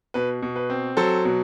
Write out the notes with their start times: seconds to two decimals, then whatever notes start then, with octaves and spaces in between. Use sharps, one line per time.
0.14 B2 B4
0.42 B2
0.56 B4
0.70 C4
0.97 F#3 A4 C5
1.25 B2